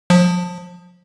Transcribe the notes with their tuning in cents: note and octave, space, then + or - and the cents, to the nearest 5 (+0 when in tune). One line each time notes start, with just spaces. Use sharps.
F3 +30